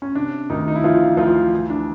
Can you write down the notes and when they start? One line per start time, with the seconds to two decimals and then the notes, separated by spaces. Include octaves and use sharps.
0.02 C#4
0.15 C3 D4
0.50 D2 D#3 D#4
0.68 D#4
0.76 E4
0.83 E3 F3 F4
1.17 D2 F3 F4
1.53 E3
1.70 D4